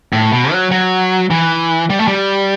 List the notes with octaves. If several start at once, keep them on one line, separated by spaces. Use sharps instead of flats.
A2
B2
F#3
F#3
E3
G3
A3
G3